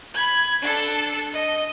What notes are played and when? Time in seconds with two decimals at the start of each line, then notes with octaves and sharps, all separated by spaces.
0.14 B5 G#6
0.62 D4 A4
1.34 D#5